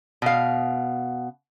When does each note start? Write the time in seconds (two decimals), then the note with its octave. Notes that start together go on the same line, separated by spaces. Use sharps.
0.22 B2 F5